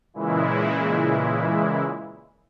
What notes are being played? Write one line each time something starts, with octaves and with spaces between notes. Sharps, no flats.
A#2 C#3 E3 G#3 E4